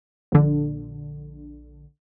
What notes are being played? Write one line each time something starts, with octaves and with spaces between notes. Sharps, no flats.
A#1 D3